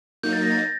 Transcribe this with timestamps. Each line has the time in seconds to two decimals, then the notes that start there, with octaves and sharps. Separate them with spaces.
0.23 F#3 A#3 D#4 G6
0.33 A6
0.42 A#6
0.52 A6